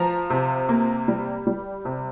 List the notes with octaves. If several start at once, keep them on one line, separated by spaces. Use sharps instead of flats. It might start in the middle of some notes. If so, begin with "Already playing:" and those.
Already playing: F3 A#5
C3
A#3
G3
G3
C3